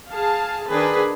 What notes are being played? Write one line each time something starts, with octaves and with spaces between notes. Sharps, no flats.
G#4 F5 A5
D#3 D4 G#4 B4